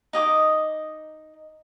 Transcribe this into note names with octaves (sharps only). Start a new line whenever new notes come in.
D#4 D#5 G5 D6